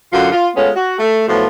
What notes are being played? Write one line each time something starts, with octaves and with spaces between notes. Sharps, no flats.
F#2 D3 F4 F#4
F4
G#3 A3 B3 C#4 F4
F#4
A3
A2 F3 F#3 A3 B3